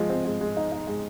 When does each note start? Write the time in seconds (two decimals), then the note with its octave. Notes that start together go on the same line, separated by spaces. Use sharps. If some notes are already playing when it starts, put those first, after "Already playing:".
Already playing: F3 G#3
0.10 C4
0.25 G#3
0.41 G#3
0.57 D#4
0.72 D#4
0.87 G#3